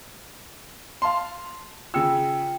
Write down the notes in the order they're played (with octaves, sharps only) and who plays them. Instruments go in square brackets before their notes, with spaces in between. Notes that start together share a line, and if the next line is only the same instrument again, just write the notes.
[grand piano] F5 A5 C6
[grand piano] C#3 E6 [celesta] F4 G5 C#7